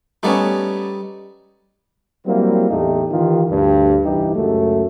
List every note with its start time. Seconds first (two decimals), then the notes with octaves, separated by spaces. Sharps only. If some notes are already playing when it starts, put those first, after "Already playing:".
0.23 G3 A3 B3 C#4 D#4 D5
2.26 F#3 G3 A#3 C4 E4
2.70 E2 A2 A3 D#4 G4
3.10 D#3 E3 F4 G4
3.50 D2 G2
4.05 C2 G2 E3 D#4 G4
4.35 C#2 F#2 F#3 A3